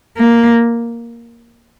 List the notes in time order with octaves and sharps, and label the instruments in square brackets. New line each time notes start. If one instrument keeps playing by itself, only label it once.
[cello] A#3